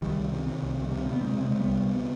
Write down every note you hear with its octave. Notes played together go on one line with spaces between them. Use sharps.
C2 D#3 G3
C2
C3
C3
C2
C2
C3
C3
B3
C3 G#3 C4
C3
G#3 C4
C3
C2 G3 B3
C2
C3